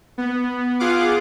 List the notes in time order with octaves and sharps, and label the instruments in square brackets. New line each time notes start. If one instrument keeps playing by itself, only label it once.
[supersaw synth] B3
F4 G#4 F5 F#5 D6